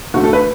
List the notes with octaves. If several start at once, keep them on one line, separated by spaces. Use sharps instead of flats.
D2 D3 A3 F#4
A4
B4